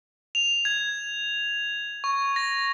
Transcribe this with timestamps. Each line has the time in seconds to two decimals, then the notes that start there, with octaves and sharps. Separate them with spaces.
0.35 F7
0.65 G#6
2.04 C#6
2.36 A#6